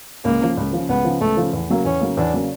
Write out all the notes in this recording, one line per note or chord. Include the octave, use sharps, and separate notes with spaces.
C#2 A#3
C#3 F3
C#2
C#3 F3
C#2 B3
C#3 F3
C#2 A3
C#3 F3
E2
C#3 F#3 A#3
E2 C#4
C#3 F#3 A#3
E2 D4
C#3 F#3 A#3